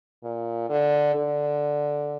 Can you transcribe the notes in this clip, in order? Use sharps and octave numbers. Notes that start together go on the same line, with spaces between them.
A#2
D3
D3